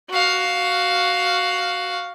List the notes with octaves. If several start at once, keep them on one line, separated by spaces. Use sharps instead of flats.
F#4 F5